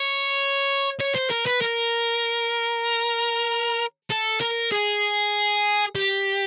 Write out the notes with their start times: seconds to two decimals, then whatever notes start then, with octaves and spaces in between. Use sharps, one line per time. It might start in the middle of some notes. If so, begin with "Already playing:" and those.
Already playing: C#5
1.01 C#5
1.16 C5
1.31 A#4
1.47 B4
1.62 A#4
4.10 A4
4.41 A#4
4.72 G#4
5.96 G4